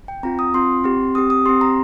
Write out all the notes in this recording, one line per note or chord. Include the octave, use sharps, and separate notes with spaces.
G5
C4 F4 A#5
D#6
C4 F4 C6
C4 G4
C4 G4 D#6
D#6
C4 G4 C6
A#5